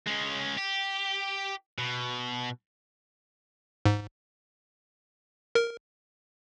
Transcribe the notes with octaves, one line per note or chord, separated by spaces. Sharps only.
G#3 C#4
G4
B2
G#2
A#4